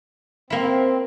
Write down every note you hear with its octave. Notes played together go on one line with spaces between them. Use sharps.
A#3 C4 E4